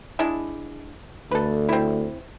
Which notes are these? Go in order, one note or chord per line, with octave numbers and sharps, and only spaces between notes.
G#3 D4 E4
D2 A4 B4
C4 E4